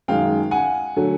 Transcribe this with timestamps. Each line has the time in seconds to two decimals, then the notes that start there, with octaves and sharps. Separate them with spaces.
0.08 F#2 D#3 G#3 F5 G5
0.51 F#5 G#5
0.96 D3 F#3 A3